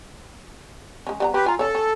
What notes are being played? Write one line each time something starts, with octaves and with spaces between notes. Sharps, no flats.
G#3 C#4
G3 B3 A#5
C4 G4 B4
F4 G#5 A#5
C#3 A4 C#5
C#4